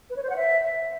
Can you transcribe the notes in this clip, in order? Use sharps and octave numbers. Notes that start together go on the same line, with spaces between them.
B4
C#5
C5
F#5
E5